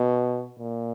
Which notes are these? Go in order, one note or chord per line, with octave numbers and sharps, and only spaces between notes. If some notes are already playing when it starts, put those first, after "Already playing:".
Already playing: B2
A#2